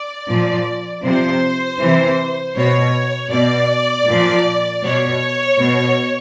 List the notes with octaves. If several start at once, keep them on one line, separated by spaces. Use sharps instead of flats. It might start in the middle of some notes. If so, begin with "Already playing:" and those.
Already playing: D5
A#2 F3
C3 F3 C5
C3 E3
B2 C#5
B2 D5
A#2 F3
B2 C#5
B2